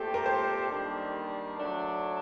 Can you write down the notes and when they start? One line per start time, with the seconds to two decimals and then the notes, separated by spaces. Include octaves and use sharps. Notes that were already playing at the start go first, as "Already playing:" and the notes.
Already playing: A#2 A3 C4 G4 A4
0.14 A#4
0.26 C5
0.70 D#3 G3 A#3 D4
1.59 F#3 A3 D4